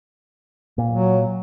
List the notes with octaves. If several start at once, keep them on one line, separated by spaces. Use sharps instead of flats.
A#2
F#3